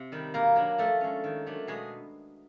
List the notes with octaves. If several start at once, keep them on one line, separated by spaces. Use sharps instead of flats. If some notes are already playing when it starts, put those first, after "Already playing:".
Already playing: C3
D#3 G3
B2 A#3 A#4
F#3 A#3 D4
F3 A3 A4
G#3 C#4
D#3
F#3 A3 D4
B2 G#3 G#4